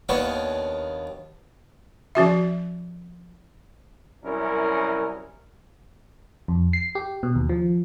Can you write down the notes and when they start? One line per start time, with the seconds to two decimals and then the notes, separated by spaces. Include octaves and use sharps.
0.09 D#2 B3 D4 C#5
2.15 F3 C#4 F#4 E5
4.23 C2 F#2 C#4 E4 A#4
6.48 F2
6.73 C7
6.95 G4
7.23 B2
7.36 D#2
7.49 F3